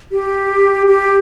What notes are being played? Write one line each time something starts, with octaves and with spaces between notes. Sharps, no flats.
G4
G4